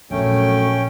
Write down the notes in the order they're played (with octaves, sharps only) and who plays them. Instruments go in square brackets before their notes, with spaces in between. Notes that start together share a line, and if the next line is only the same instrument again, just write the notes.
[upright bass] A#1 [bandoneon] F#2 A3 [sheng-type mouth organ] C#4 G5